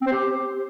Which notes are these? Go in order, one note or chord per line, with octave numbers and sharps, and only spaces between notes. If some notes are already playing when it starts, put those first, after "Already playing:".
C4
C5
G4